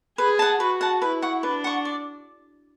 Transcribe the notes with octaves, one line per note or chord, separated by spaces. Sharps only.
G#4 B4
F#5 A5
F#4 B4
F#5 A5
E4 B4
F#5 C#6
D4 B4
F#5 C#6
D5